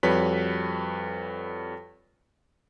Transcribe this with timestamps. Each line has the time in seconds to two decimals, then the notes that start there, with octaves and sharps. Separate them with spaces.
0.03 F2 G3 F#4 B4 C#5 B6